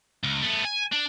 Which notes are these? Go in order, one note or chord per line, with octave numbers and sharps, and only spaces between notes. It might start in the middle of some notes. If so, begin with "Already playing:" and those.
C#2
A3 B3
G#5
D4